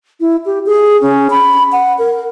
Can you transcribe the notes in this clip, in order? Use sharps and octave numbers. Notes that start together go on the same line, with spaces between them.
E4
G4
G#4
C#4
B5
F#5
A#4